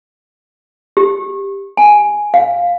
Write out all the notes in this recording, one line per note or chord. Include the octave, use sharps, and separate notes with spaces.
G4
G#5
F5